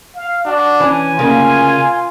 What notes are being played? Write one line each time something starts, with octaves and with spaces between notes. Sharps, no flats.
F5
D4 F#4
E3 C#4 G#5
D2 C#3 A#3 F4